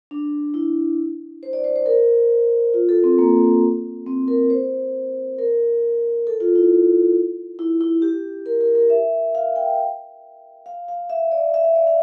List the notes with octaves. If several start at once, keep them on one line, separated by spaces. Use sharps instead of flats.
D4
E4
C5
D5
C5
C5
A#4
F4
A4
C4
A#3
C4
A#4
C5
A#4
A4
F4
E4
E4
E4
G4
A#4
A#4
A#4
E5
F5
G5
F5
F5
E5
D5
E5
F5
D5
F5